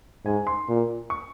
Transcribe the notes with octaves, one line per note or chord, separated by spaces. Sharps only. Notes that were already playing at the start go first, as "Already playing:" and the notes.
G#2 G#5
C6
A#2
C#6